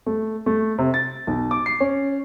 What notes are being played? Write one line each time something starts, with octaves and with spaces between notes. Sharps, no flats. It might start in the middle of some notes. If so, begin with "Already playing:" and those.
A3
A3
C3
A6
B1
D6
C7
C#4